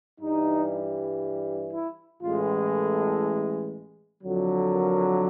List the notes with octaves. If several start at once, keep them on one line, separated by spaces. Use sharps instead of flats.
G2 E3 G3 D#4
E4
A1 A2 E3 G#3 F4
A4
F2 D3 F#3
A#4